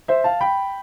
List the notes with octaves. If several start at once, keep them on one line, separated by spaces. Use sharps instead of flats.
C5 E5
F5 A5
G5 B5